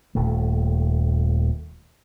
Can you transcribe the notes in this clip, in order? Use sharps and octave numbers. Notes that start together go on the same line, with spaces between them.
D#1 D#2 A3